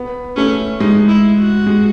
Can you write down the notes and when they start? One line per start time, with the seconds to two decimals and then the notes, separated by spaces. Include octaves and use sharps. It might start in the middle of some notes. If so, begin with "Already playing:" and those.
Already playing: B3
0.37 A3 C#4
0.80 G#3 D#4
1.09 E4
1.38 F#4
1.67 G#3